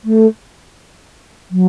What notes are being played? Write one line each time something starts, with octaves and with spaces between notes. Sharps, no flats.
A3
F#3